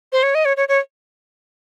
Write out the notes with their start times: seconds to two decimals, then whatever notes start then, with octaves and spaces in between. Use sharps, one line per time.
0.12 C5
0.23 C#5
0.35 D#5
0.45 C#5
0.57 C#5
0.68 C#5